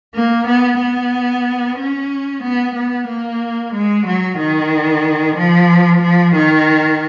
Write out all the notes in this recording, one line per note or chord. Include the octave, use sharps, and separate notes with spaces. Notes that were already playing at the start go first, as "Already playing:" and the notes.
A#3
B3
B3
C#4
B3
B3
A#3
G#3
F#3
D#3
F3
F3
D#3